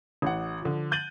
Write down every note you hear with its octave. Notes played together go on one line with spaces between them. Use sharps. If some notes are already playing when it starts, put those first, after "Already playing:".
A1 F#5
D3 F3
F#6 G6 A6 D#7 F#7